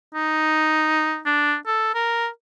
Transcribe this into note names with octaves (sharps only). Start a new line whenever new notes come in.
D#4
D4
A4
A#4